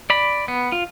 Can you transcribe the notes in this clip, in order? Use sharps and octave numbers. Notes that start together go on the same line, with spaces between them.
D5 B5
B3
F4